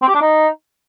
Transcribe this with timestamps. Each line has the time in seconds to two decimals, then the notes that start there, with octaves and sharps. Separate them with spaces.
0.02 C4
0.08 G4
0.15 D4
0.21 D#4